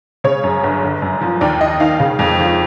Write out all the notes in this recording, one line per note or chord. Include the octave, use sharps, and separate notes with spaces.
C#3 C#5
F#2
G1
D3
F#2
F3
D#2 D5
D#3 D#5
D#3 F5
C#3
F2
F3